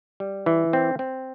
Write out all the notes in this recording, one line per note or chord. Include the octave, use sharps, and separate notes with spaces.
G3
E3
C4
C4